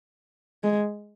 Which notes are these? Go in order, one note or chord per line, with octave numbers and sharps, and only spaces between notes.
G#3